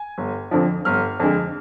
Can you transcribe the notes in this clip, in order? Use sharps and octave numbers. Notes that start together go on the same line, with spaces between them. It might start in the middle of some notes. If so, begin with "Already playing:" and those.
Already playing: G#5
G1
F2 D3 F3
G1 F6
F2 D3 G#3